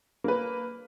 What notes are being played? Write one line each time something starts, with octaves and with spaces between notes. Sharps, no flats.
A#3 B4